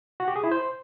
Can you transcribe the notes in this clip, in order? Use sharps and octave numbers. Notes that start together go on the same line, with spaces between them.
F#4
G4
G#4
E4
C5